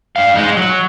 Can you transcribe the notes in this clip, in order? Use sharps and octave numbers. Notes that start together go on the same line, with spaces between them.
G2 F5
G#3 D#4
F#3